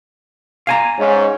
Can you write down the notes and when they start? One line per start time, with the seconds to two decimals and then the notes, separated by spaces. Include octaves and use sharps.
0.67 F5 G#5 A#5
0.98 G#2 C#4